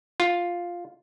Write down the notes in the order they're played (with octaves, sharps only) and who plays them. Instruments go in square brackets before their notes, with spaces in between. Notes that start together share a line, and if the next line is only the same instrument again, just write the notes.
[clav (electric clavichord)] F4